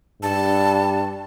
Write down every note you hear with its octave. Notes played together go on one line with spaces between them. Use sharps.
G2 A5